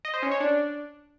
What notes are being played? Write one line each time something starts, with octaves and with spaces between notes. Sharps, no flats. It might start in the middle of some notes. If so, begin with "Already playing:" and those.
D#5
C5
C#4
C#5
D4